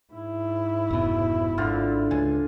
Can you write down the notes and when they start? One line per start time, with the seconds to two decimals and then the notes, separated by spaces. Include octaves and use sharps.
0.13 G#2 E4
0.90 F1 B2
1.58 G#1 D3 D4 F4
2.11 C#2 G#5